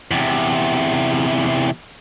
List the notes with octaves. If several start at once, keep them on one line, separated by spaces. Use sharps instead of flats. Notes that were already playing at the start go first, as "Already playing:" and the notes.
E2 C3